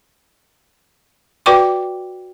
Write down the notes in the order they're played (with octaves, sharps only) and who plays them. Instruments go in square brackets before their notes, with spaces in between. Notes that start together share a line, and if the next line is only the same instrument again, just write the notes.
[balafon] F#4 B4 D5 G5 C#6 D6